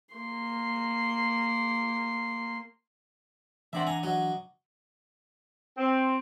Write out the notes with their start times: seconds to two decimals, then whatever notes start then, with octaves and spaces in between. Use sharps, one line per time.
0.14 A#3 C6
3.73 E3 C4 D4 D5 E5 F#5
3.87 G#5 A#5
4.03 F#3 C#5 D#5
5.78 C4